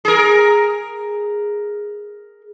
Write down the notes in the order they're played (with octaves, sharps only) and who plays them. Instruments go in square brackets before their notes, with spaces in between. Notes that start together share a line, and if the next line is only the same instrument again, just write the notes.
[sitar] G#4 A#4